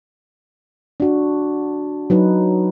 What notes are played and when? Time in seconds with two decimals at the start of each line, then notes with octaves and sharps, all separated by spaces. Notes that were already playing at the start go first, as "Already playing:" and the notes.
1.00 D4 F#4
2.10 F#3 D#4 B4